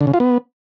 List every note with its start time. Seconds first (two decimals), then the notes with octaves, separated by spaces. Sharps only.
0.01 D3
0.07 C#3
0.14 F4
0.20 B3